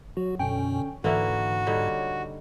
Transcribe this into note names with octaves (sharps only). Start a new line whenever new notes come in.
F#3 F#4
F#2 B2 D3 C#4 G5
G#2 D3 E3 A#3 E4 F#4
D3 G3 D#4 C#5